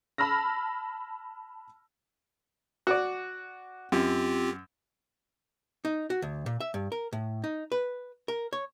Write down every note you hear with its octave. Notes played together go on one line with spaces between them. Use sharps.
A5 B5 E6 F6 A#6
F#4 D5
F#2 C4 F4 G4
D#4
F#4
D2
A#2
E5
G2
A#4
A2
D#4
B4
A#4
C#5